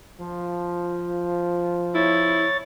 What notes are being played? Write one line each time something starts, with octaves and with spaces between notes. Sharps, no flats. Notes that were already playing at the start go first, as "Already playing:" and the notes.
F3
E4 C#5 A6